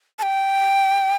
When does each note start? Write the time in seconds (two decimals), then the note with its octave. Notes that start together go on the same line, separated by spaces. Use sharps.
0.19 A5
0.23 G5